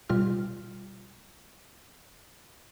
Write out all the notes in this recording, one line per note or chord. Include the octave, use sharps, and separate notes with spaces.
B2 G3 F4 F6